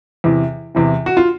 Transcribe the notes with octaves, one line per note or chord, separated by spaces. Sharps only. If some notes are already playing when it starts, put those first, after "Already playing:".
E2 C3 E3
E2 C3 E3
F#4
F4